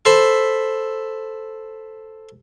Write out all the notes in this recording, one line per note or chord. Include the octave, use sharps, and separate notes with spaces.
A4 C5 E5 B5